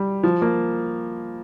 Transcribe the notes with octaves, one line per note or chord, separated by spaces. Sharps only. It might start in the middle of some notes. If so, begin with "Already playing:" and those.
Already playing: G3
F3
A#3